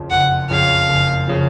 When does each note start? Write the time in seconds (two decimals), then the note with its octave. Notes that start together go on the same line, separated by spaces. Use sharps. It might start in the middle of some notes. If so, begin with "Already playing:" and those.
Already playing: F#1 F2 C#3 F3
0.10 F#1 F#5
0.49 F2 C#3 F3 F5
0.89 F#1
1.28 C#3 F3